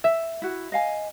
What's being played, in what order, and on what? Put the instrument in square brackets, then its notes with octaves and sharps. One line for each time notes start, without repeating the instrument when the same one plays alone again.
[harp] E5
[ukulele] E4 F#4
D#5 F5 G#5